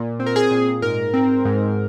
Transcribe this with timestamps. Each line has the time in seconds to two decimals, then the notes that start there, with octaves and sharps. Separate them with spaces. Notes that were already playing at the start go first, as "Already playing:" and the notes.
Already playing: A#2
0.20 C4
0.26 A#4
0.36 G#4
0.51 A#2
0.82 G#2 A#4
1.14 C4
1.45 G#2